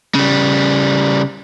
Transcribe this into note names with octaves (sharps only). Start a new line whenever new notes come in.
C#3 G3